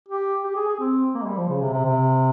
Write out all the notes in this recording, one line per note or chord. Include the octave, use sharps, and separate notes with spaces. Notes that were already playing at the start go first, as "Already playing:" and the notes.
G4
G4
G#4
G#4
C4
A#3
G#3
G3
F3
C#3
C3
C3
C3